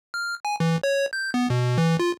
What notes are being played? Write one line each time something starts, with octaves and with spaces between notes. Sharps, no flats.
F6
G#5
E3
C#5
G6
B3
B2
E3
F4